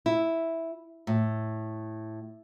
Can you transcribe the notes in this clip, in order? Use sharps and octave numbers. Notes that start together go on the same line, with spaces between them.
E4
A2